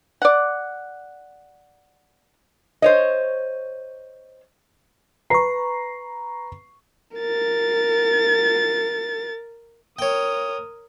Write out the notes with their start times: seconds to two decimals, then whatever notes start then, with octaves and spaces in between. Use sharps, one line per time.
0.22 D5 F#5
2.82 C5 C#5 D#5
5.30 B4 A#5 C#6 C7
7.17 A#4 A6
9.99 A#4 C#5 G5 D#6